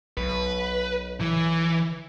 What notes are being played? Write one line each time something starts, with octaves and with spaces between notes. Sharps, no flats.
B1 B4
E3